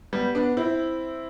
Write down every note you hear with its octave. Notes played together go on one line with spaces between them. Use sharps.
G3 B3
B3 D4
C4 E4